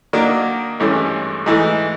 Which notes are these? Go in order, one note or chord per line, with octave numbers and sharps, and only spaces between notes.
D#3 F#3 A#3 D4
G#1 G2 E3 A3 C#4
G#2 E3 A3